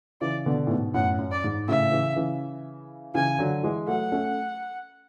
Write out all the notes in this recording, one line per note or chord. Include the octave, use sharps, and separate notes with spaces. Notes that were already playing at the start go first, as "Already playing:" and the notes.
C#3 E3 D5
B2 D3
A2
G#2 B2
F#2 A2 F#5
F#2
D5
G#2
A2 C#3 E5
C#3 E3
C#3 E3
C#3 E3 G#5
D3 F#3
E3 G#3
F#3 A3 F#5
A3 C#4